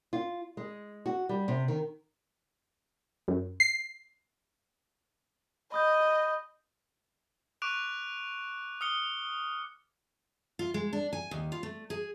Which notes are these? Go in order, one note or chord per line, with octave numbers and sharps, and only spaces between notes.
F4
G#3
F#4
G3
C3
D#3
F#2
C7
D#5 B5 D#6 G6
C#6 D6 F#6 D7 F7
D#6 F6 C#7 G7
F4
G#3
D4
G#5
D#2
F4
A3
G#4